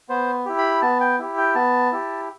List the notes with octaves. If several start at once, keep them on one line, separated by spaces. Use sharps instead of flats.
B3 C5
E4 G4
B5
B3 A5
G5
E4 G4
G5
B3 A5
E4 G4